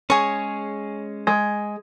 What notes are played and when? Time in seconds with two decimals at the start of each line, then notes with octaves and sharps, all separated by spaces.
0.10 G#3 C#4 G#4 C#5
1.27 G#3